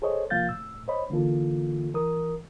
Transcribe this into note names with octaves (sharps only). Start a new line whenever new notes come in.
G#4 A4 C5 C#5 D#5
C2 F3 A#3 F5 G6 A6
A2 E6
C5 C#5 D#5 B5
D3 E3 A#3 F4 A4
E3 A#4 D#6